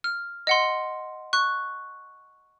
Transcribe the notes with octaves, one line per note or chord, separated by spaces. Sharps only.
F6
D#5 F#5 C6
C#6 F#6